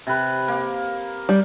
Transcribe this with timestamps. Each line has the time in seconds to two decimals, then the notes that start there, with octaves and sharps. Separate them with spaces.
0.07 C3 B4
0.48 A#3
1.29 G3